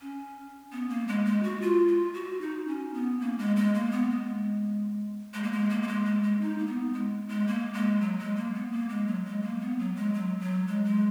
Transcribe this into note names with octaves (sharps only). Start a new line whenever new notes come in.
C#4
B3
A#3
G#3
G#3
F#4
F4
F4
F#4
D#4
C#4
B3
A#3
G#3
G#3
A#3
B3
G#3
G#3
A#3
G#3
A#3
A#3
G#3
G#3
G#3
D#4
A#3
B3
G#3
G#3
A#3
G#3
F#3
G#3
A#3
B3
A#3
G#3
F#3
G#3
A#3
B3
F#3
G#3
F#3
F#3
G#3
G#3